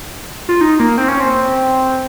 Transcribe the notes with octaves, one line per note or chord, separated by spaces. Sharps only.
F4
D#4
A#3
C4
C#4
C4